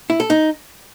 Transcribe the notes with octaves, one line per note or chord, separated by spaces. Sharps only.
E4
A4
D#4